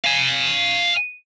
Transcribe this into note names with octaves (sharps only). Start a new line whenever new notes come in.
F5 G#5